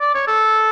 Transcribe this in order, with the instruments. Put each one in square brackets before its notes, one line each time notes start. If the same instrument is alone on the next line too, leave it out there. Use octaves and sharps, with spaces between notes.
[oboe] D5
C#5
A4